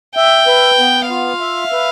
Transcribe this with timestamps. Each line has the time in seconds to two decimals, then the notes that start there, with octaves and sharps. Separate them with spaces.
0.16 E5 G5
0.47 B4
0.79 B3
1.09 F4 F5
1.40 E5
1.72 B4